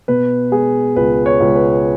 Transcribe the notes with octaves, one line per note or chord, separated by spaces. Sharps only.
B2 B4
G#3 G#4
C#2 B4
C#5
C#2
B4